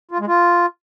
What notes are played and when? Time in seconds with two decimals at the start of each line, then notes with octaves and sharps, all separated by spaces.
0.11 F4
0.19 G#3
0.28 F4